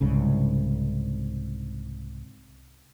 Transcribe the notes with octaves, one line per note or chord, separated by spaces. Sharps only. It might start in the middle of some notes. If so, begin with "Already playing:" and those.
C2 G#2 C#3